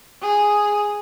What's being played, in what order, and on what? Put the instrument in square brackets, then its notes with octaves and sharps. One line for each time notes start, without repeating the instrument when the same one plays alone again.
[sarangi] G#4